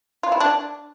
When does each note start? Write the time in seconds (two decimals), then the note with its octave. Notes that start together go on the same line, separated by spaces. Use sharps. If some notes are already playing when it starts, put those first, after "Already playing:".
0.23 F4
0.32 E4
0.40 D4